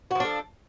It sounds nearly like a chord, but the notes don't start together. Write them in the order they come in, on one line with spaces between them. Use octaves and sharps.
F#4 F3 D4 A4